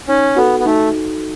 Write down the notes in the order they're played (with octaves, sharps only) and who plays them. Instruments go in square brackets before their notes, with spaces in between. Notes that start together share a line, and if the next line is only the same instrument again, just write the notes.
[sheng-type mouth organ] C#4 [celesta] D#4
[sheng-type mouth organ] B3 [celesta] F#4 A4
[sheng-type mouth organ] B3
[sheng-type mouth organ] A3 [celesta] D#4